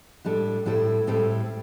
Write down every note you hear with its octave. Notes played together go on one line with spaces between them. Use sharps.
A2 G3 D4 A4
A2 G3 C4 E4 A4
A2 G3 C4 E4 A4